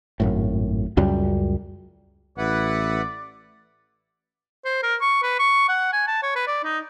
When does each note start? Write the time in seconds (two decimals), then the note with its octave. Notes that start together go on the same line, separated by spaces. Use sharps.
0.20 G#1 F#2 A2
0.97 C#2 F#2 G3
2.38 A1 E4 B4 D5 F#5
4.65 C5
4.83 A#4
5.01 C#6
5.23 B4
5.39 C#6
5.68 F#5
5.93 G#5
6.07 A5
6.23 C#5
6.35 B4
6.47 D5
6.64 D#4